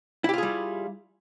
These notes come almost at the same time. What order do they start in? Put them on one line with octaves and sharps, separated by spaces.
E4 G4 F4 G#4 G3